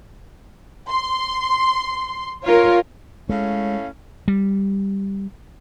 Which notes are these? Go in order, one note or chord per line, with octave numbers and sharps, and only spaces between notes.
C6
F4 A#4 C#5
A2 G#3 C#4 F5
G3